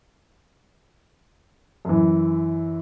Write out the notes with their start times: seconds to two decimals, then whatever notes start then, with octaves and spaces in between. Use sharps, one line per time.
1.85 F#2 E3